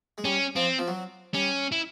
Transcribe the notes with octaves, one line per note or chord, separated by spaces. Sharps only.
G#3
G3 C#4
F3 C4
F3
F#3
G3 C#4
E4